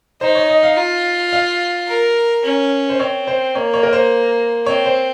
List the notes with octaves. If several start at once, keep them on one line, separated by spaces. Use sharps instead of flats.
D#4 C5
C#5
D#5
F5
F4
F5
A#4
C#4
C5
C4 C#5
C5
A#3 C#5
C#5
A#4
C5
C4 C#5
C5